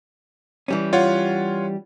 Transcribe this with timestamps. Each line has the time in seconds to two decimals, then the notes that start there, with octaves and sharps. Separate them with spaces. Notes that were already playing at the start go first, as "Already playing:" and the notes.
0.68 E3 G3 C#4
0.93 F4 C#5 F#5